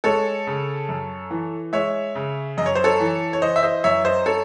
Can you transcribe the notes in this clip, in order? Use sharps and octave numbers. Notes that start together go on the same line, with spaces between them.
G#3 A4 C#5
C#3
F#2
E3
G#3 C#5 E5
C#3
F#2 D#5
C#5
C5
A4 C#5
E3
C#5
E3 C5 D#5
E5
C5 D#5
F#2 C#5 E5
C5 D#5
A4 C#5